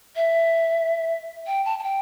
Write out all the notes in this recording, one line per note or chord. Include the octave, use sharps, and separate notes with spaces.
E5
G5
A5
A5
G5